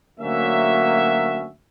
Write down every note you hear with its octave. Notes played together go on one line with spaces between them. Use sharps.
D2 F#3 A#3 C#4 F#4 E5